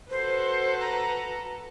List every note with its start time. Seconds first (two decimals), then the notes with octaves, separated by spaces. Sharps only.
0.10 F#4 A4 B4 C5
0.80 A#5